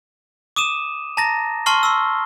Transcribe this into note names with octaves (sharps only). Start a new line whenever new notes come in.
D6 D#6 D#7 E7
A5 A#5 A6 A#6
A5 C6 C#6 F6 C7 G7
C6 C#6 E6